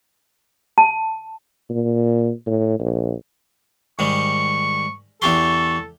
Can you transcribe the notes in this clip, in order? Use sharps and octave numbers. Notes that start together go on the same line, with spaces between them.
A5
A#2
A2
A#1
G#2 D#3 G3 C#6
E2 G4 A4 C6 C#6